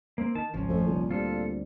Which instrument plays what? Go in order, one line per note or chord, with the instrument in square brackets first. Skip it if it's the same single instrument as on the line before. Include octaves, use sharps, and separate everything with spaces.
[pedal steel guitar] A#3 C4
[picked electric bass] D#3 [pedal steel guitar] A5
[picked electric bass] G#1 C#2 [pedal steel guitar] F3 C#4
[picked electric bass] G#1 A3 [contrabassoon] F2
[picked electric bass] G1 C2 D#3 [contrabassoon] A#2
[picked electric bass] D2 G3 C4 [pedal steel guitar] F4 A4